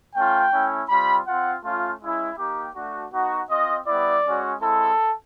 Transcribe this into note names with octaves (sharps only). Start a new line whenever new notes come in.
A3 C#4 F4 G5
A3 C#4 E4
G3 C4 F4 B5
C4 F4 F#5
A3 C#4 F4
G#3 C#4 E4
A#3 D#4 G4
A3 D4 F#4
B3 D#4 F#4
C4 F4 D#5
G3 B3 E4 D5
G#3 C#4 F#4
G#3 C4 E4 A4